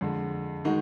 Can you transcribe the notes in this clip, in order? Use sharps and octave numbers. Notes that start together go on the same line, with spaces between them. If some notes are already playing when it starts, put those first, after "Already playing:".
F2 D3 G#3
D#3 G#3 D#4 F#4